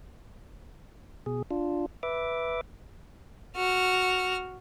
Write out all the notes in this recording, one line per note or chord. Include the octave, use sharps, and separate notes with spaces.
B2 G#4
D4 F4
B4 E5 D6
F#4 F6